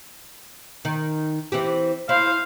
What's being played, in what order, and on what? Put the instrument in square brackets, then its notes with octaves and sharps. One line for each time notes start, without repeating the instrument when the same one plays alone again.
[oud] D#3
E3 C4 G4
[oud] E4 [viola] C5 F5